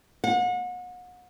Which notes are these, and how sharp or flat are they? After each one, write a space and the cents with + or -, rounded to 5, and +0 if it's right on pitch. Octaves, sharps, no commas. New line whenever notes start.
F#5 -35